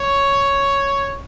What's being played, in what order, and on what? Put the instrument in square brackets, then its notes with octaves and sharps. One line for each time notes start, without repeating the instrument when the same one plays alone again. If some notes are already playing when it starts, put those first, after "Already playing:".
Already playing: [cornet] C#5